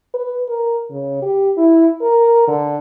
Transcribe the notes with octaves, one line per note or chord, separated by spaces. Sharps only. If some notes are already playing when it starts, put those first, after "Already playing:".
B4
A#4
C#3
G4
E4
A#4
D3